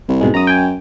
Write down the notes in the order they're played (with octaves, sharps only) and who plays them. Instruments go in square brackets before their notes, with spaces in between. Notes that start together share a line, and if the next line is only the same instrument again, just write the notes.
[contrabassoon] C2
[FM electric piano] G#2 B2 G#3
[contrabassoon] F#2 [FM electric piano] A#5 D#6
[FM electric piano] G5 G#5